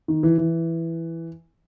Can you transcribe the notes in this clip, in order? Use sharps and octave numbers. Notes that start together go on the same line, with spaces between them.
D#3
E3
E3